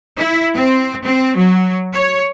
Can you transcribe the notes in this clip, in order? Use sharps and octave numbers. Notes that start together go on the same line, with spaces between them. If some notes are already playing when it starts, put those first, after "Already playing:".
E4
C4
C4
F#3
C#5